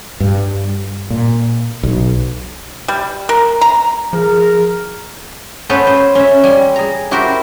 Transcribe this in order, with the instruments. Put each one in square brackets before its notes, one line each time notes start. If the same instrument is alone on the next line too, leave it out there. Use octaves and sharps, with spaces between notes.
[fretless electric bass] G2
A#2
B1
[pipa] G3
A#4
A#5
[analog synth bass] F3 [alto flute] G#4 [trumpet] A#4
[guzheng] B3 C#4 A4 B4 C5
C5
C#4 E5
G3 G#5 C6
G#4 A#5
E4 F#4 G4 A#4 C5